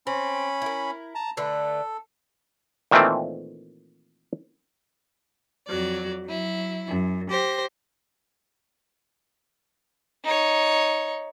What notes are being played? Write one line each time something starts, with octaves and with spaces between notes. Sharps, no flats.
C4 C#4 B5
E4 A#4
A5 A#5
D3 A3 A4 B4
A#2 D#3 E3 A3 C4
F2 F#3 D5
F#3 E4
F#2
G4 C5 A#6
D#4 C#5